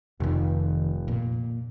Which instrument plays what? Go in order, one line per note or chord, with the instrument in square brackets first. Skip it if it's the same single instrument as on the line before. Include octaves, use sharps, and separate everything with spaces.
[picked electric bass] F1 [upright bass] F2 D#3
[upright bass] A#2